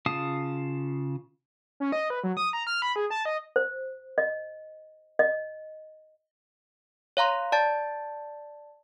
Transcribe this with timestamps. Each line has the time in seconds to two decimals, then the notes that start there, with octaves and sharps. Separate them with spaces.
0.06 C#3 F4 F5 A5 D#6
1.80 C#4
1.92 D#5
2.10 B4
2.24 F#3
2.37 D#6
2.53 A#5
2.67 F6
2.82 B5
2.96 G#4
3.10 A5
3.25 D#5
3.56 C5
4.18 D#5
5.19 D#5
7.17 C#5 F5 A#5 C6
7.52 D5 A5 A6